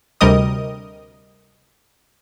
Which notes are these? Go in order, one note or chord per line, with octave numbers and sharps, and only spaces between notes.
D2 C3 G3 A#4 D#5 D#6